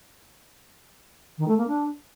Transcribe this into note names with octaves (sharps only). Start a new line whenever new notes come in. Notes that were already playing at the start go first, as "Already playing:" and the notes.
D#3
A3
A#3
D4